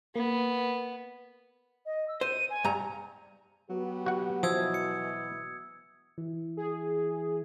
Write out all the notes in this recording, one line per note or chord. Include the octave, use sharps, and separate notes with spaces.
A#3 B3
D#5
E6
C5 D#7
G#5
G2 A#5
F#3 B3 G4
F#4 F#5
B2 E3 F3 D#6 E6 G#6
C#7
E3
G#4